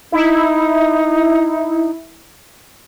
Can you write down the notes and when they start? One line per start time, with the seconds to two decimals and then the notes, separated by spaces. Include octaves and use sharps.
0.12 D#4 E4